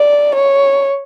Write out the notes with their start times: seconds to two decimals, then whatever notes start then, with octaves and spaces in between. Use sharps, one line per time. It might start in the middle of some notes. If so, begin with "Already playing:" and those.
Already playing: D5
0.35 C#5